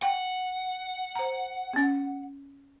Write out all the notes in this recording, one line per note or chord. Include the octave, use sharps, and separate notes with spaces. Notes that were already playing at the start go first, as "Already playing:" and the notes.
F#5 G5
C5 A#5
B3 C#4